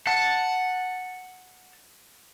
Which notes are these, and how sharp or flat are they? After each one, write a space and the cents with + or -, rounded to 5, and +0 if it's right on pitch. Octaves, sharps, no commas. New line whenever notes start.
F#5 -5 A5 +5